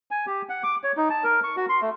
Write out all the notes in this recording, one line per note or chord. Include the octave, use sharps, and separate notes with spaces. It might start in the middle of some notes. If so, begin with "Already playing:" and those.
G#5
G4
F#5
D6
C#5
D#4
A5
A#4
C#6
F#4
C6
A3